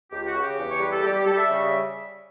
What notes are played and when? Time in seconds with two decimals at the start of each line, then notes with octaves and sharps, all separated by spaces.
0.12 C#2 G4
0.27 F#4
0.35 C#3
0.42 G4
0.58 E2
0.71 C#5
0.80 G3 B4
0.92 A4
1.03 G3 G4
1.14 G4
1.25 G3 A4
1.37 E5
1.49 C#3